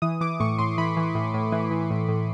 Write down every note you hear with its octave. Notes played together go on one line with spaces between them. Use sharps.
E3 D#6
E3 D6
A2 C#6
A2 C6
E3 B5
E3
A2
A2
E3
E3
A2
A2